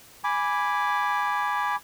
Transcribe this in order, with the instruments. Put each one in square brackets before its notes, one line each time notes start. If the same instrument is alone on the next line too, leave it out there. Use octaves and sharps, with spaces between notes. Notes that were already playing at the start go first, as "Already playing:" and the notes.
[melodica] G#5 B5 D6